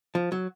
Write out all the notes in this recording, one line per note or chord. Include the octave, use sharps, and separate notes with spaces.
F3
F#3